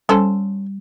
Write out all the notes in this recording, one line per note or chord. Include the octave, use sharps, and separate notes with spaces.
G3 C#4 A4 C5